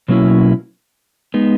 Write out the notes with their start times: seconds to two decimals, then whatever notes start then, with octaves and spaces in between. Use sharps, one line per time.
0.08 B2 F#3 A#3 C#4 E4
1.34 G#3 B3 D#4